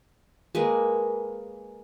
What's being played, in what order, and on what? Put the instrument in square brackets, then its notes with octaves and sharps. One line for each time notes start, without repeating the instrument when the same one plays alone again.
[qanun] G#3 A#3 B4